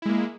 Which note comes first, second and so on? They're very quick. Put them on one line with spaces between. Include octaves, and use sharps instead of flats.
E4 G#3 A#3